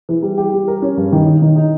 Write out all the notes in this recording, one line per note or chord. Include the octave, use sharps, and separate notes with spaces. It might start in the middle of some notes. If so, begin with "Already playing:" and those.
E3
G3
G4
G3
A#4
C#4
G2
D#3
D#4
D#3
D#4